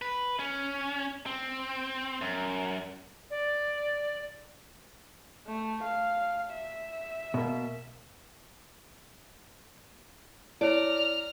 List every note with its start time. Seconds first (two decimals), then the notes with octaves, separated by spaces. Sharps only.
0.02 B4
0.39 C#4
1.26 C4
2.21 F#2
3.31 D5
5.47 A3
5.83 F5
6.52 E5
7.34 B2 A#3
10.61 E4 C#5 D5 A#5 F6 D7